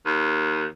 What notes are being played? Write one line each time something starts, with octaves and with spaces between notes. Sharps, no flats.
D#2